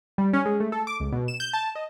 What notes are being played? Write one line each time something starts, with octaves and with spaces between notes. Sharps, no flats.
G3
C#4
G#3
A3
A4
D6
C#2
B2
E7
G6
A5
D#5